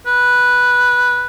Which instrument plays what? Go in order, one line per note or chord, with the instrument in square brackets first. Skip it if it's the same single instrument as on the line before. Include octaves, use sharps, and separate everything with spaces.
[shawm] B4